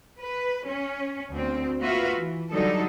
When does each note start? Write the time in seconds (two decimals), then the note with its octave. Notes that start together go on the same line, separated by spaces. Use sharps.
0.18 B4
0.66 C#4
1.31 D2 C4
1.80 A#3 F4 F#4 B4 E5 F5
2.17 E3
2.51 D3 F#3 G3 D#4 A4